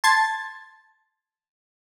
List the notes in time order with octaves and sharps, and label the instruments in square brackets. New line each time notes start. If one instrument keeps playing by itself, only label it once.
[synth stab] A5 C6 G#6 A6